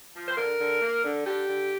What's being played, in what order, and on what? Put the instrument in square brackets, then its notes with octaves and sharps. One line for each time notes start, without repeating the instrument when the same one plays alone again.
[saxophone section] F3
C5
D3 A#4
D3
A#3
D3
D3 G4
D3